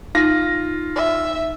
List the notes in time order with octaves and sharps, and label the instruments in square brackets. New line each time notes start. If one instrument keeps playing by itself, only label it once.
[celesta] D#4 [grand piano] F4 A#6
[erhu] E5